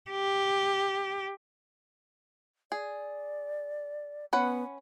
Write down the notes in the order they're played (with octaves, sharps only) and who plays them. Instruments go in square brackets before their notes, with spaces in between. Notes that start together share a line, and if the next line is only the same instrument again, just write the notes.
[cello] G4
[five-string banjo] G#4 [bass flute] D5
[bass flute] B3 [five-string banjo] C#4 B4 F#5